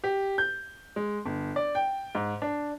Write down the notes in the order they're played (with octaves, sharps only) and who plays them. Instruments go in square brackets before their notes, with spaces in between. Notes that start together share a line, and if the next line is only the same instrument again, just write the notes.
[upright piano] G4
G6
G#3
G1
D5
G5
G#2
D4